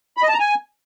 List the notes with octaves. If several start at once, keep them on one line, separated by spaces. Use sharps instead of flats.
B5
D#5
A5
A#5
G#5